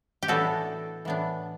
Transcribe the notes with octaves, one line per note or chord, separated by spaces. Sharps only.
G4
A2 E3 B3 D4 F#4 A4
A2 E3 B3 D4